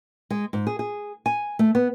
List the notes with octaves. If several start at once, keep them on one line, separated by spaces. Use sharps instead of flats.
G#3
G#2
G#4
G#4
G#5
A3
B3